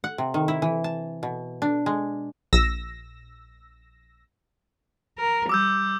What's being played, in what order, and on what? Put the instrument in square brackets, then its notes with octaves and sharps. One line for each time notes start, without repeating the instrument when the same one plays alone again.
[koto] F#5
C3
D#3
E4
E3
A5
B2
D4
G#3
[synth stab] A#1 E6 A#6
[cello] A#4
[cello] G3 [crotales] D6 E6 G6